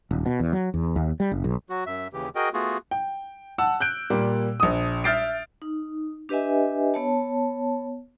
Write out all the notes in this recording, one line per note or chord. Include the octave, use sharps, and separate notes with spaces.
D#1
B2
E2
F#3
E2
D#2
G3
F#1
B1
F#3 F#4
F#2 E5
D#2 C#3 E3 G4
F#4 G#4 A#4 D#5 G5
A3 B3 F4 F#4 G#4
G5
F#5 A5 E6
F#6 G6 D7
A#2 G3 A#3
A#1 D#6
E5 F6 G6 A6 C7 D7
D#4
D4 G4 B4 D#5 E5 G#5
B3 C#5 A5